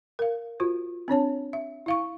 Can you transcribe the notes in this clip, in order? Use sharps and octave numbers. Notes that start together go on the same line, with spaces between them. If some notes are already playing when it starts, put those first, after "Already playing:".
A#4 F5
F4 F#4 C5
C4 D4 C#5 A5
E5
E4 F5 C#6